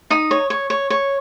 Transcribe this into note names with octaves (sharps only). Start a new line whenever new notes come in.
D#4 D#6
C#5
C#5
C#5
C#5